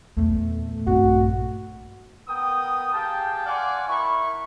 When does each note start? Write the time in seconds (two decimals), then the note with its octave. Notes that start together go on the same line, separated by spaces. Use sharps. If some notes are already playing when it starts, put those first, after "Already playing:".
0.17 E2 A#2 A3
0.87 A#1 G2 A#3 C4 F#4
2.29 B3 A#4 G5 D#6
2.93 G4 G#4 F5 G5 A5
3.46 D5 F5 F#5 G#5 C6 D6
3.89 E4 A#4 B5 C#6